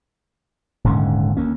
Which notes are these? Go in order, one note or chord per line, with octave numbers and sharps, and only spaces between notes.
D#1 G#2 D3 C#4
D2 A#3 C#4